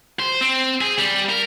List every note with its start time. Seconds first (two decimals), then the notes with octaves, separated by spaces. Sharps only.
0.20 C5
0.41 C4
0.81 G#4
0.98 G3
1.29 A#4